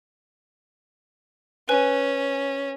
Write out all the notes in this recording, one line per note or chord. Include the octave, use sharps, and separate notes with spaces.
C#4 B4 G#5